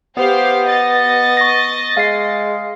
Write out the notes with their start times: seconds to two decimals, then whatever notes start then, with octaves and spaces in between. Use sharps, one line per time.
0.17 B3 G4 C5 F5
0.68 D#5 A6
1.37 C#6 A#6
1.97 G#3 F5 C7